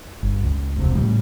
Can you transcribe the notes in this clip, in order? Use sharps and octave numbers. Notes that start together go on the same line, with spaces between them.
G1
C#2
E1 C3
A2 C#3 G3